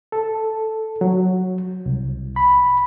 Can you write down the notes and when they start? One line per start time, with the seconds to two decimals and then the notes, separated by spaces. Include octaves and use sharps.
0.12 A4
1.01 F#3
1.86 C2
2.36 B5